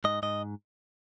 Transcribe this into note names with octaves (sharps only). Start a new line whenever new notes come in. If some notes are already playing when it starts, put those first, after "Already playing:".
G#2 D#5
G#2 D#5